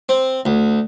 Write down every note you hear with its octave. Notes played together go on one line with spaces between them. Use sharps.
C4
D2